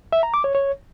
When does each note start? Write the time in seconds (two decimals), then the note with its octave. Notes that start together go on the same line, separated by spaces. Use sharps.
0.13 E5
0.23 A#5
0.34 D6
0.44 C#5
0.55 C#5